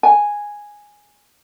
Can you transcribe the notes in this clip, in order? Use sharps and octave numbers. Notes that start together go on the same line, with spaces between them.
G#5